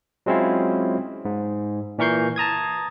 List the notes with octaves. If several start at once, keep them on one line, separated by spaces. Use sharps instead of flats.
F#3 G#3 C4 C#4 E4 F4
G#2
A#2 E3 A#4 C#6 G6 C7
A5 A#5 D#6 G#6